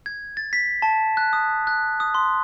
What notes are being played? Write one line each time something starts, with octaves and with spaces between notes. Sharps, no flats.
G#6
A6
B6
A5
F#6
D#6
F#6
D#6
C6